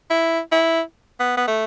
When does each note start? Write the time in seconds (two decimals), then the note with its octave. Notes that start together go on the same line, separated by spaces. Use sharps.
0.10 E4
0.52 E4
1.20 B3
1.37 B3
1.48 A3